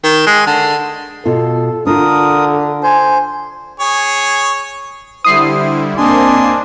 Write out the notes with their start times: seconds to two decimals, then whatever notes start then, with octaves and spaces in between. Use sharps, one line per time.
0.03 D#3
0.26 G#3
0.47 D3
1.26 B2 F4 A4
1.87 D3 D4 F4 A4 A#4 D#6
2.83 C5 G#5
3.80 G#4 C#5
5.25 D3 G3 E4 C5 D#6 C7
5.98 A#3 C4 D4 D#5 G#5 C6